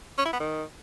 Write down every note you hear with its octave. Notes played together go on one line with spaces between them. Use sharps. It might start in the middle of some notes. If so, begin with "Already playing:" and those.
C#4
E4
B3
D#3